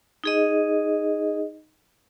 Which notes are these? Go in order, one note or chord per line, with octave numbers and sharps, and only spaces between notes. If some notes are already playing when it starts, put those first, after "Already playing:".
D#4 G#4 D#5